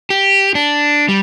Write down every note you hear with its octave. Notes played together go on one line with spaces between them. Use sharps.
G4
D4
G3